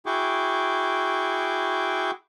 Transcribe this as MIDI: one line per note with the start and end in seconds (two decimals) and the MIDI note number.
0.06 2.11 64
0.06 2.11 66
0.06 2.11 68
0.06 2.11 79
0.06 2.11 85
0.06 2.11 86